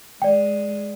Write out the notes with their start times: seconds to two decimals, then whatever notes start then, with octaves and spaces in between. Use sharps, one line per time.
0.22 G#3 D5 G5